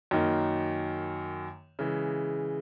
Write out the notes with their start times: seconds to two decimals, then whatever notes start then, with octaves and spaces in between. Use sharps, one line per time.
0.11 F#2 D#3 A#3 D#4
1.79 C#3 E3 G#3